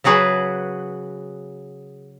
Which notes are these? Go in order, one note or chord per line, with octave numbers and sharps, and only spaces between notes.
C#3 F#3 F#4 G#4 B4